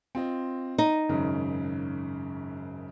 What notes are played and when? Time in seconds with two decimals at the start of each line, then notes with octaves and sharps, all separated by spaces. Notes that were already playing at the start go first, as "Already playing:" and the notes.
0.15 C4 F4 D#5
0.78 D#4
1.09 G#1 F#2 C#3